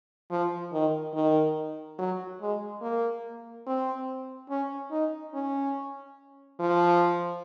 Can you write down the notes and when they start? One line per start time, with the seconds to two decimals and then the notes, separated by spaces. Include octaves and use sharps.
0.31 F3
0.73 D#3
1.14 D#3
1.99 F#3
2.41 G#3
2.82 A#3
3.66 C4
4.50 C#4
4.91 D#4
5.34 C#4
6.60 F3